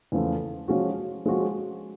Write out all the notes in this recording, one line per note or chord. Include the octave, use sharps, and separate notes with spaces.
E2 C#3 F3 A3
F3 G#3 C#4 F#4
F3 G#3 C#4 F#4